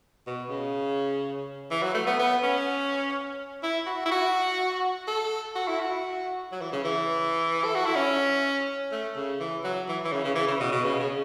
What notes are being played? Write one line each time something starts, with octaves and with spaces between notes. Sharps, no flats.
B2
C#3
E3
F#3
A3
B3
B3
C#4
E4
F#4
E4
F#4
A4
F#4
E4
F#4
F#3
E3
C#3
E3
A4
F#4
E4
C#4
A3
C#3
E3
F#3
E3
E3
C#3
C#3
E3
C#3
B2
B2
C#3
C#3